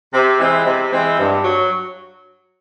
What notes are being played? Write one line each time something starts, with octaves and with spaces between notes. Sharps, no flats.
C3
E3 G#3 C4
C3
E3 G#3 C4
G2
F#3